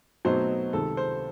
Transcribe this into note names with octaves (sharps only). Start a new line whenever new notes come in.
B2 F#3 A3 C4 D#4 C5
C#2 C3 D#3 A4
C5